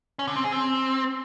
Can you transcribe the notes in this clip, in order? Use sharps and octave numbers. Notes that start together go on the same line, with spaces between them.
C#4
D3
C4
G#4
C4